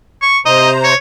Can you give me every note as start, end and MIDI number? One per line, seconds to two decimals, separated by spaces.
0.22 0.38 85
0.46 0.94 48
0.46 0.94 72
0.46 0.70 75
0.46 0.94 82
0.84 0.96 73